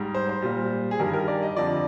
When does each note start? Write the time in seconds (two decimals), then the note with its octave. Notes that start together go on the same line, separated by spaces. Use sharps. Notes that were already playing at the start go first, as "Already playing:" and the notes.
Already playing: G#2 G3
0.14 C5
0.29 C5
0.42 A#2 G3
0.91 G#4
0.99 G2 D#3 G3 A#4
1.13 A#4
1.28 D5
1.43 D#5
1.56 F2 D3 F3 D5